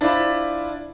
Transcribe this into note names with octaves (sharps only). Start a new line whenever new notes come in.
D4 E4 F4 C5 D5 B5